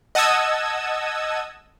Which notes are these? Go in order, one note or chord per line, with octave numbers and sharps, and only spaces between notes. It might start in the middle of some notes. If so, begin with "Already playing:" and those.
D#5 F#5 A5 D#6 E6 G#6